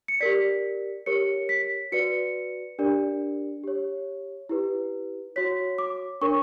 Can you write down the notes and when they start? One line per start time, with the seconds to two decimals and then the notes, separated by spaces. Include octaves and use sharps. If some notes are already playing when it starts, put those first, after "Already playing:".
0.08 C#7
0.21 G4 A#4 D5 B6
1.06 G4 A#4 C#5 C#7
1.49 B6
1.92 F#4 B4 D5 C#7
2.79 D4 G4 A#4 D5
3.64 G4 C#5
4.49 E4 G4 B4
5.36 F#4 C#5 B6
5.78 D6
6.21 D4 A#4 C#5 C#6